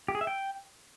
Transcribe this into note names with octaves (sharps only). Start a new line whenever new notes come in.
G4
G#4
E5
G5